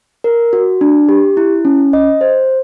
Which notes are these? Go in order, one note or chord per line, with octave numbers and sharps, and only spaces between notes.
A#4
F#4
D4
G4
E4
C#4
D#5
C5